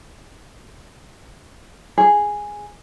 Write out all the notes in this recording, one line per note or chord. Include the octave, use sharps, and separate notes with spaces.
G#4